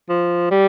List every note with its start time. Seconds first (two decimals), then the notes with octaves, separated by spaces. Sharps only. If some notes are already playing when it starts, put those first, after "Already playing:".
0.09 F3
0.51 G3